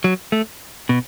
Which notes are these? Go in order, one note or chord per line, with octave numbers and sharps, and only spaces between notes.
F#3
A3
B2